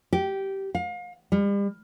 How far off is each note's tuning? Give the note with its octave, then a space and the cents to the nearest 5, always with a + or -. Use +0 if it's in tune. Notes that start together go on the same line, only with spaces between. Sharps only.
G4 -15
F5 +35
G3 +40